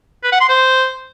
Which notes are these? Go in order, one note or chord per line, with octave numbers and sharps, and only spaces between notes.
B4
F#5
C6
C5